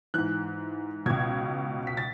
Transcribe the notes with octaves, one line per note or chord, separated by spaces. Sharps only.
G#2 E3 F#6
C#2 B2 G#6
B6
A6